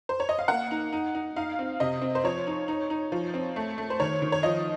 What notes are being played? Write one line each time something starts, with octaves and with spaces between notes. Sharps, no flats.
C5
C#5
D#5
F5
A#3 F#5
D#4
D#4
D#4
D#4 F5
C4
C3 D#5
C4
C5
F3 C#5
D#4
D#4
D#4
F3
C4
A3
A3
C5
D#3 C#5
D#3
C#5
F3 D#5